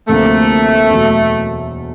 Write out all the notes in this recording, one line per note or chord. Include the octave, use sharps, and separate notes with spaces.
D2 C3 F3 A3 A#3
E2 B2 F#3